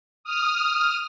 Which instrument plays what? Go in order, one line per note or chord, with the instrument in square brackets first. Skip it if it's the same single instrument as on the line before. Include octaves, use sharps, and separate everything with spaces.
[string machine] D#6 F6